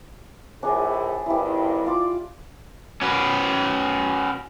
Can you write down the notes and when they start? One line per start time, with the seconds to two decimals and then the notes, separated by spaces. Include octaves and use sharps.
0.63 A#1 A2 D4 G#4 D5
1.26 G#1 G2 E4 G4
1.86 F4 D5 D6
3.02 C#4 F#4 B4